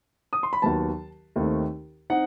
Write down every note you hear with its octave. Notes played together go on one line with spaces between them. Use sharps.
D#6
C6
B5
D#2 D#3 F#3 B3 A5
D#2 D#3 A3 C4 D#4
C4 D#4 F#5